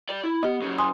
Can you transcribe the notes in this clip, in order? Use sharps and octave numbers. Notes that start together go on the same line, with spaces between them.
D5 G5
E4
B3 G4 D#5
F#2 C#3
G#5 C6 D#6